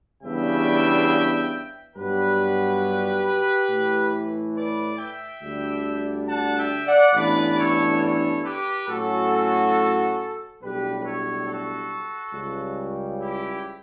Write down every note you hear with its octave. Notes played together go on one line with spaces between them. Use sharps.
E2 C#3 G3 B3 D4 E5 G5
G2 F#3 B3 D4 G4 B4
A2 E3 A3
B4 D5
E5 G5
D2 D3 G3 D4
F#5 A5
E5 G5
D5 F#5
A1 G2 E3 B3 D4 B4 D5
A4 C#5
A4 C#5
G4 B4
A2 F#3 C#4 F#4 A4
B1 A2 G3 D4 G4 B4
A4 C#5
F#4 A4
C#2 C#3 G3
E4 G4